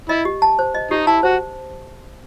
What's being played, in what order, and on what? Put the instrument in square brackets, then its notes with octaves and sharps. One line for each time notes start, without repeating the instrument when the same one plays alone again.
[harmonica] E4 [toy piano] D#5
[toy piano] G4
A5
C5
D#5
[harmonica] D#4 [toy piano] G4
[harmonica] E4 [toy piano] A5
[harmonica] F#4 [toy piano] C5